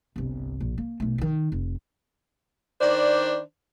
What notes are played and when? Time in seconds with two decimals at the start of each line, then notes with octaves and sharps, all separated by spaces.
0.16 G1 C2
0.61 A#1
0.78 A#3
1.00 B1 A3
1.18 D#3 E3
1.52 F1
2.81 D#3 D4 C5 D5